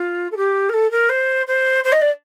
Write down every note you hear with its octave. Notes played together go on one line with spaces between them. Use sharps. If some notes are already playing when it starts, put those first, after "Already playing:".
Already playing: F4
A4
G4
A#4
A4
A#4
C5
C5
C5
D#5
D5